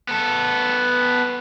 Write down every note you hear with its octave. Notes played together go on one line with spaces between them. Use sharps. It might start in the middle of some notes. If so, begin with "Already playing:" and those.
B3 A4